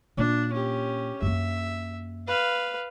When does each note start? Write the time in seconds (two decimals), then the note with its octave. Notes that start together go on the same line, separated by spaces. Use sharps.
0.17 A#2 A#3 D4
0.53 C#4 G4
1.22 F#2 A#3 E5
2.27 B4 F5